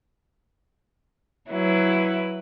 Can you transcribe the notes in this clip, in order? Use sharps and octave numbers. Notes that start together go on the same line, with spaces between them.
F#3 E4 B4